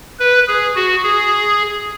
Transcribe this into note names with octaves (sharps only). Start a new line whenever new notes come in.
B4
G#4
F#4
G#4